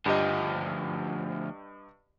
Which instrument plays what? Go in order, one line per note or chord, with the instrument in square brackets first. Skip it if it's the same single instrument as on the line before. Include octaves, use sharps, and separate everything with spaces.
[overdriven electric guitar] D2 F3 [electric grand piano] G2 G4 D#5